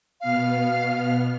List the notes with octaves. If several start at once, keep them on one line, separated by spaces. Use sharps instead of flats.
B2 B3 F5 F6